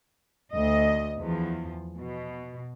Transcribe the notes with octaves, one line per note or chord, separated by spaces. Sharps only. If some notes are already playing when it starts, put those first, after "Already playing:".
D2 D#5
E2 F3
B2